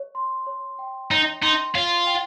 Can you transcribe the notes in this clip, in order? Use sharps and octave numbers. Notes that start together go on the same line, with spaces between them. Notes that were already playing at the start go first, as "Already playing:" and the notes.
Already playing: C#5
C6
C#5
G5
D#4 C#5
D#4 C6
F4 C#5
G5